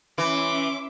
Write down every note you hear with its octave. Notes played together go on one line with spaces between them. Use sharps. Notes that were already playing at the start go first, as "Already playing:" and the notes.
E3 C#4 E5 C6 D6